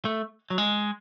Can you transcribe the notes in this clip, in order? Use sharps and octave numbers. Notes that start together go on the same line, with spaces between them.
A3
F#3
G#3